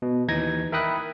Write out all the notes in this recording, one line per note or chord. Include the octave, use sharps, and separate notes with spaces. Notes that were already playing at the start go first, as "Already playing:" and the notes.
B2
D#2 E3 D#4 G#6 A#6
A#4 E5 G5 B5 D#6 F#6